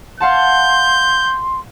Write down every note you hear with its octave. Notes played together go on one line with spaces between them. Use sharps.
F5 F#5 A5 C6 G6